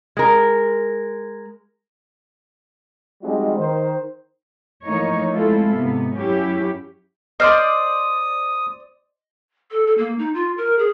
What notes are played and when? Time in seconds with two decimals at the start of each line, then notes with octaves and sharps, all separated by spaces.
0.17 G#3 A#4
3.23 F3 G3 G#3 C4 D#4 F#4
3.58 D#3 C5
4.85 E3 F3 A3 A#3 D#4 C#5
5.34 G#3 A3 C4 E4 F4 A4
5.75 G#2 C3 B3
6.17 F#2 F#3 C#4 E4 G4
7.40 C5 D5 D#5 C6 D#6 F6
9.71 A4
9.87 A4
9.98 A#3
10.18 D#4
10.34 F4
10.57 A#4
10.78 G#4